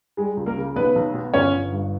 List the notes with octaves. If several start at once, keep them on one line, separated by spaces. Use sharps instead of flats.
G3 G#3 G#4
C#2
A#3 A#4
C#3
B1 B3 B4
B1
B2
G1 C#4 C#5
G1
G2